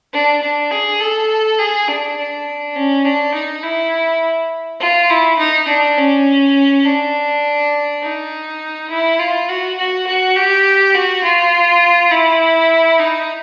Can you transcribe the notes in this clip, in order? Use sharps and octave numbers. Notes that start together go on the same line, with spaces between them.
D4
D4
G#4
A4
G#4
D4
D4
C#4
D4
D#4
E4
F4
E4
D#4
D4
C#4
D4
D#4
E4
F4
F#4
F#4
F#4
G4
F#4
F4
E4
D#4